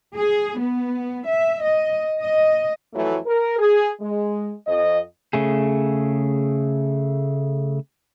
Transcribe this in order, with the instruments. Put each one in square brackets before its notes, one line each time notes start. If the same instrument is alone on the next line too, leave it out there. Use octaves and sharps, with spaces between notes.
[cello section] G#4
B3
E5
D#5
D#5
[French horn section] F2 E3 F#3 A3
A#4
G#4
G#3
F2 D#5
[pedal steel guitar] C#3 A3 G#4